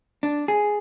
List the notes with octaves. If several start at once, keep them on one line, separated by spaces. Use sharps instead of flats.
D4
G#4